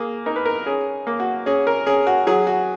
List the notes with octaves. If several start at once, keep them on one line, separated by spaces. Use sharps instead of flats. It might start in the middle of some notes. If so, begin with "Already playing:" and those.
Already playing: A#3 G#4
D#4 A#4
B4
A#4
C#4 G#4
A#3
F#4
C#4 G#4
A#4
C#4 G#4
F#4
F#3 G#4
F#4